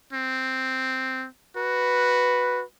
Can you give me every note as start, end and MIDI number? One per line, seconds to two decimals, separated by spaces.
0.13 1.26 60
1.57 2.62 66
1.57 2.63 71